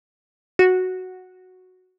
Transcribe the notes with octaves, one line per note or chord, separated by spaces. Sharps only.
F#4